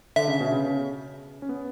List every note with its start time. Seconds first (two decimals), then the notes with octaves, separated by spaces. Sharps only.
0.16 D3 E5
0.28 C#3
0.40 B2
0.52 C#3
1.42 C#4
1.49 B3